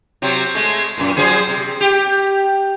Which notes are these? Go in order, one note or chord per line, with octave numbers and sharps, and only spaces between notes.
C3 F#3 C4
G#3 A3
F#2 A#2
F3 F#3 G#4
C3
G4